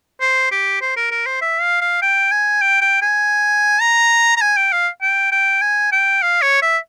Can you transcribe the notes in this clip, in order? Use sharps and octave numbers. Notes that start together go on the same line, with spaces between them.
C5
G4
C5
A#4
A#4
C5
E5
F5
F5
G5
G#5
G5
G5
G#5
A#5
A#5
G#5
G5
F5
G5
G5
G#5
G5
F5
C#5
E5